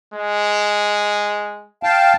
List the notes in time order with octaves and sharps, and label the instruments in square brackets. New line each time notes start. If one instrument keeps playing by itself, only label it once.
[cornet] G#3
[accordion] F5 G5 A5